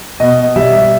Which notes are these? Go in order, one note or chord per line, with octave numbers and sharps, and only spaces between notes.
B2 D#5
G3 E5